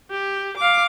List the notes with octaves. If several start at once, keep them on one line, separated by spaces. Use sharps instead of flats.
G4
F5 D6